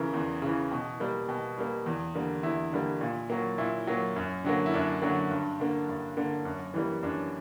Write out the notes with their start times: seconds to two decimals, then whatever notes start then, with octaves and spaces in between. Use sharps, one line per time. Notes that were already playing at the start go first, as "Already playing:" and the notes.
Already playing: C#3 E3 E4 A#4
0.13 E2
0.42 C#3 E3
0.71 B2
1.00 G3 A#3
1.29 B2
1.58 G3 A#3
1.86 E2
2.14 D3 G3 A#3
2.43 E2 E4
2.72 D3 G3 A#3
3.01 A#2
3.30 F#3 A#3
3.58 A#2 E4
3.87 F#3 A#3
4.16 F#2
4.44 D3 F#3 A#3
4.66 E4
4.74 F#2 D4
5.02 D3 F#3 A#3
5.31 G2
5.60 D3 A#3
5.89 G2
6.17 D3 A#3
6.45 F#2
6.74 E3 G3 A#3
7.03 F#2 D4